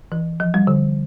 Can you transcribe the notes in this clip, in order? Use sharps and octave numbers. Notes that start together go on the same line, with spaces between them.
E3
F3
G3
D3